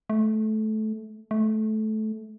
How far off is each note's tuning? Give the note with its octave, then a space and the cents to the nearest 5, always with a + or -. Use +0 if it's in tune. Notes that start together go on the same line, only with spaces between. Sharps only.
A3 -20
A3 -20